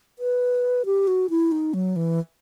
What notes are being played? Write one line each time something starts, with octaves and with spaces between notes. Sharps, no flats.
B4
G4
F#4
E4
D#4
F#3
E3